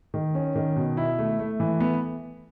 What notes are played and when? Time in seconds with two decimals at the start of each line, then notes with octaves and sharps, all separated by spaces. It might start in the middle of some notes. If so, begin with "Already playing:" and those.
0.14 D#3
0.35 C#4
0.56 D#3
0.76 B2
0.97 E4
1.19 A3
1.39 A3
1.60 E3
1.80 B3